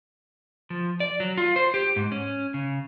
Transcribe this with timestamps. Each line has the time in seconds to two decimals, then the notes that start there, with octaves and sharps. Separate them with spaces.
0.70 F3
1.00 D5
1.20 F#3
1.38 F4
1.56 C5
1.74 G4
1.96 G#2
2.12 C#4
2.54 C#3